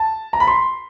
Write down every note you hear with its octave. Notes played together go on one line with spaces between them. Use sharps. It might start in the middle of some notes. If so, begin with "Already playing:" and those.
Already playing: A5
A#5
B5
C6